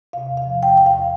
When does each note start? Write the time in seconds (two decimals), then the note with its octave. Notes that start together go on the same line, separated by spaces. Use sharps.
0.13 C3 F5
0.30 E2
0.37 F5
0.46 F3
0.63 F3 G5
0.77 E2 G5
0.86 F5